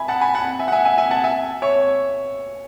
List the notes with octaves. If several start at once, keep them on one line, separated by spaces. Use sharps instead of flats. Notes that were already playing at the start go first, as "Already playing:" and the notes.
Already playing: E5 G#5 B5
F#5 A5
G#5 B5
F#5 A5
E5 G#5
F#5
E5 G#5
E5 G#5
E5 G#5
F#5 A5
E5 G#5
C#5 E5